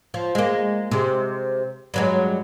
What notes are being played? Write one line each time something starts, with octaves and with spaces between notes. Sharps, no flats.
F3
G#3 A#3
C3 G#3
G2 F#3 G#3